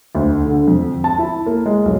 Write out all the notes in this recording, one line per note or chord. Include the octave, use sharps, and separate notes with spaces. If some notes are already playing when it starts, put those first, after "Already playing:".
D2
D3
F2
A5
E4
A#3
G#3
B1